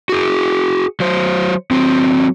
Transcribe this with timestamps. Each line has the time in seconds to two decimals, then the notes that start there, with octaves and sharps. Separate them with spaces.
0.09 F#4 G#4
1.00 F#3 C5
1.71 F#3 C4